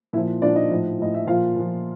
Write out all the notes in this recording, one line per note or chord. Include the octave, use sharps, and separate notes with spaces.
A#2 F3 E4 E5
A#2 F3 D4 D5
D#4 D#5
A2 F3
A2 F3 D#5
E5
A#2 F3 F4 F5
A#2 F3